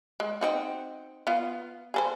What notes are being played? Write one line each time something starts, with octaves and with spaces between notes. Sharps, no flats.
G#3
C4 D#4 F#4
B3 F4
G#4 A4 C5